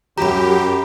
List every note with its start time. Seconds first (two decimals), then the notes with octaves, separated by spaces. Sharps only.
0.18 F#2 G4 A#5 B5